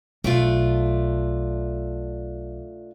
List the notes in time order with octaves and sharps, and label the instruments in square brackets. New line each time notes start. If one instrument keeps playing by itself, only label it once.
[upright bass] B1 [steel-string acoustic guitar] A3 D4 F4